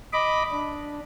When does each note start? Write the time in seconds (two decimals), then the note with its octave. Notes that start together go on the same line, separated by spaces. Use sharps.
0.13 D#5 B5 D6
0.51 D4